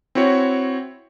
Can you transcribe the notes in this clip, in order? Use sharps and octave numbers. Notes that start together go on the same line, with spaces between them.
C4 E4 F#4 C#5